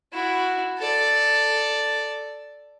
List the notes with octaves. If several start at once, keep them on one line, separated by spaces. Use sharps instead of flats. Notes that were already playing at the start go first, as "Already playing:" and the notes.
E4 F#4
A4 D5